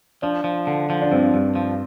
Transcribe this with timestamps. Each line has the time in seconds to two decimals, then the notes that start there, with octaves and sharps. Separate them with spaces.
0.22 F3 D4
0.44 F3
0.67 D3
0.90 F3
1.02 D4
1.11 G2 C4
1.34 G2
1.55 F3